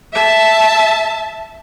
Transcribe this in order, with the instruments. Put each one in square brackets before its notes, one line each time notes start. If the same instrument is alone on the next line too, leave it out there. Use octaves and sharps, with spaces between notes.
[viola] E5 A5